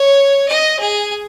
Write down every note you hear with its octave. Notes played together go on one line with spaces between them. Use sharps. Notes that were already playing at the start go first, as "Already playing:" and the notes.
Already playing: C#5
D#5
G#4